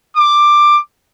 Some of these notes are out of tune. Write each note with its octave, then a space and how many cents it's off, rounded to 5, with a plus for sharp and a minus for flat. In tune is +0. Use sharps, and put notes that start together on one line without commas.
D6 +10